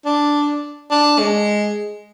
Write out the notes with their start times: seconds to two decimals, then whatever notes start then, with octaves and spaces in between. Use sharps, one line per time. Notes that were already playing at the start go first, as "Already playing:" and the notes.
0.05 D4
0.90 D4
1.19 G#3